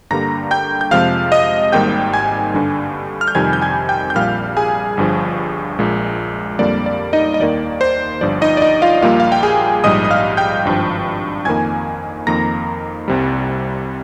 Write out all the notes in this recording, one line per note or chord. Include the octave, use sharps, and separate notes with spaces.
G2 D3 G3 A#3 A#5 A#6
G5 G6
G6
F2 C3 F3 G#3 F5 F6
D#5 D#6
G#1 G#2 D#3 G3 A#3 G5 G6
G#5 G#6
G2 D3 G3
F6
G6
F2 C3 D#3 G3 G#5 G#6
G6
G#5 G#6
G5 G6
G6
A#1 A#2 G3 F5 F6
G#4 G#5
G1 G2 F3
A#1 A#2 G#3
F2 D3 G3 A#3 D5
D5
D#4 D#5
D#5
D#2 D#3 A#3 D5
C5
G1 G2 F3 D5
D#4 D#5
D5
D#4 D#5
F4 F5
A#1 A#2 G3 A#3 F4 F5
F5
G5
G#4 G#5
A#1 G#2 G3 D#5 D#6
D#6
F5 F6
G5 G6
G#1 G2 F3
F2 D#3 A#3 G#5 G#6
F2 D#3 A#3 A#5 A#6
C2 C3 G3